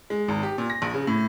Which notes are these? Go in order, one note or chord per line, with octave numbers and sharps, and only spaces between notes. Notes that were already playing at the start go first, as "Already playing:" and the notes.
G#3
G#1
G4
A#2
A#6
A#1
C#3
A2